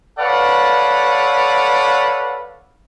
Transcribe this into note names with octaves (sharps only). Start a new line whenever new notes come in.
A4 B4 C#5 D5 F5 F#5